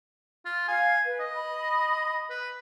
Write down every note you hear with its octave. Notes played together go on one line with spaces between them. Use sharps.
F4
F5 G#5
B4
D#5
B5
B4